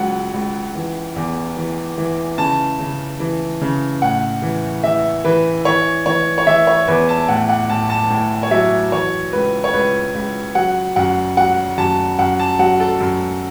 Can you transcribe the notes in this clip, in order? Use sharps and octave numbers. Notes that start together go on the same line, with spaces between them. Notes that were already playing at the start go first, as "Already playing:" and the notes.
Already playing: C#2 F#3 F#5
C#2
E3
E2
E3
E3
C#3 A5
C#3
E3
C#3
A2 F#5
E3
E3 E5
E3 B4
E3 C#5
E3 C#5
C#5
E3 E5
C#5
E2 B4
A5
A2 F#5
F#5
A2 A5
A5
A2
C#5
F#3 E5
E3 C#5
C#2 B4
C#5
C#2 B4
C#2
F#3 F#5
F#2 F#5
F#3 F#5
F#2 A5
F#2 F#5
A5
F#3 F#5
A4
F#2